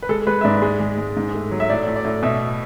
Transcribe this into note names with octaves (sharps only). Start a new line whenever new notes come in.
B4
G#3 A4
G#3 B4
E5
G#2 D5
G#3
G#3
G#3
G#2
A3
F#3
E5
A2 D5
A2
D5
A2
B2 E5